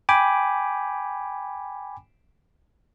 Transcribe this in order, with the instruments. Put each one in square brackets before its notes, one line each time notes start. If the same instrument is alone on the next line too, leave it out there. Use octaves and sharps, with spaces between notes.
[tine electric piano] G5 G#5 B5 D6